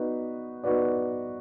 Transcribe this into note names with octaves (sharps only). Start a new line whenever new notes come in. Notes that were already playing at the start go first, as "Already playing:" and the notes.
Already playing: B3 D#4 F#4 B4 D5
B3 D#4 F#4 B4 D5